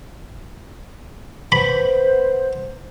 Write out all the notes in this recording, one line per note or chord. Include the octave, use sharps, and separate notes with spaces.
B3 C5 B5